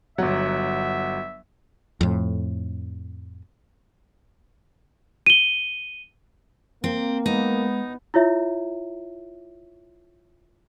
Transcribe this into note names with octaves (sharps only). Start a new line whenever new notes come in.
G1 F#3 E5 F#5
F2 A2
D#7 G7
A#3 C4
G#3 B3 D#4
E4 F4 C#5 E5